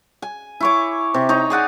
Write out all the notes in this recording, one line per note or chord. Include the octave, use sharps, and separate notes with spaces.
G#5
E4 C#5 D6
C3
D#4 C#5 A#5
G#4 D5 F#5 G#5